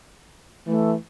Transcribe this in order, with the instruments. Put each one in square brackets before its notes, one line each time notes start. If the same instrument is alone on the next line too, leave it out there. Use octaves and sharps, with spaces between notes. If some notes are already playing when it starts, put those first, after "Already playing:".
[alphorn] E3 [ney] A3